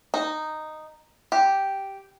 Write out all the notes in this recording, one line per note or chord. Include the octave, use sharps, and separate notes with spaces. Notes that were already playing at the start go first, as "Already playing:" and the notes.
D#4
G4